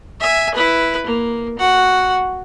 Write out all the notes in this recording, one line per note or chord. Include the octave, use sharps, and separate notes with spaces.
E5 G#5
E4 B4
A#3
F#4 F#5